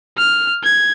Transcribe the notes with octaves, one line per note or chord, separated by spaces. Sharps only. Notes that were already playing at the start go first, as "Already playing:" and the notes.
F6
G#6